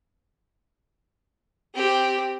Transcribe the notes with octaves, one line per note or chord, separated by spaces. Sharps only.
C4 G4